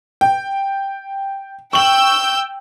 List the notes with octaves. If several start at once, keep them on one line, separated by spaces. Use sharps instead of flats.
G5
G5 C#6 E6 G6 F#7